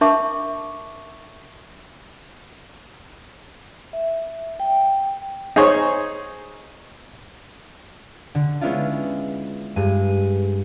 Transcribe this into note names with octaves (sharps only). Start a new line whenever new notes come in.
D4 A#4 E5 A5 C#6 D6
E5
G5
D#4 G#4 C5 C#5
D3
G#3 B3 C#4 D4 E4 F4
G2 G#3 D#7